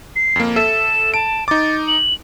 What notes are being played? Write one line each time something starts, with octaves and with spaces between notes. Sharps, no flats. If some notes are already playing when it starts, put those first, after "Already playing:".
C7
F2 A#3
A4 E5 E7
A5 D7
D#4 D6 A6
F#7